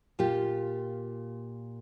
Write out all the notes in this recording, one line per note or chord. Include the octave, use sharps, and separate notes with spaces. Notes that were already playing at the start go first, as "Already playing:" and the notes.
A#2 F4 G4